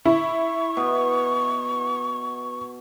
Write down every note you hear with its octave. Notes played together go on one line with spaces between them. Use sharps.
E4 C#6
B2